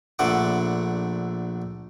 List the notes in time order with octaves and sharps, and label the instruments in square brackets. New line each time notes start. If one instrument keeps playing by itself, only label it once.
[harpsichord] A#1 D3 A3 F#5 D6